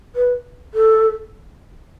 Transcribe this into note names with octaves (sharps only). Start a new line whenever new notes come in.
B4
A4